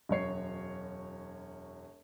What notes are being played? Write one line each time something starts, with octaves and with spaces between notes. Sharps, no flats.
E1 F#2 C#5 C7